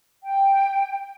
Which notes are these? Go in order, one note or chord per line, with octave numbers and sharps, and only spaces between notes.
G5